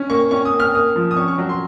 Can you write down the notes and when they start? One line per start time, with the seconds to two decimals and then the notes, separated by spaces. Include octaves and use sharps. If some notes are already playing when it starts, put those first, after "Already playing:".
Already playing: C#4
0.10 A#3 C#6
0.31 C#4 C#6
0.45 D#6
0.53 A#3
0.60 F6
0.75 A#3 D#6
0.96 F3
1.11 D#6
1.17 C#4 C#6
1.28 C#6
1.38 F#3
1.49 C6